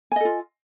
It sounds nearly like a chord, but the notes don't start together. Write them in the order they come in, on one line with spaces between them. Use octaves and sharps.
G#5 D#5 A4 F4